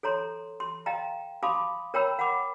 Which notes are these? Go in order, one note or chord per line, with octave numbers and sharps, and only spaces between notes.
A4 C#5 A#5 C6
C6
D#5 F5 G5 A#5
F5 A5 B5 C6 D6 D#6
A#4 C#5 G5 A#5 B5 E6
F#5 B5 D6